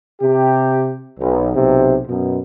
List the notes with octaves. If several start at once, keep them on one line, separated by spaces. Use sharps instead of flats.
C3 G4
B1
B1 C3
F#2 B2